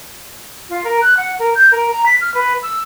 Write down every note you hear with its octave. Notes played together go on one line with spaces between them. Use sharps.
F4
A#4
F#6
F#5
A#4
G6
A#4
A#5
B6
F6
B4
E6